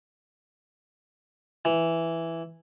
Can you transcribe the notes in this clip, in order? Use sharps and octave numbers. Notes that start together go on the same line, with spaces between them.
E3